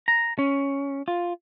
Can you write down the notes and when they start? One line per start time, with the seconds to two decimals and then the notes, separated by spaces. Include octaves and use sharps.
0.08 A#5
0.39 C#4
1.08 F4